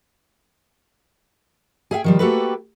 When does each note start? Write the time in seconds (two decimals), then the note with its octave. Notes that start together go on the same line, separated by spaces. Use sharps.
1.91 G#4 E5 F5 G5
2.04 D#3 F3 G3
2.19 A3 A#3 F#4 G4 A4 B4